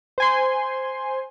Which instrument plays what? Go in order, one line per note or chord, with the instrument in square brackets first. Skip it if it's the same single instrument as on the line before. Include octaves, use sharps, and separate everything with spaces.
[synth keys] C5 G#5 C6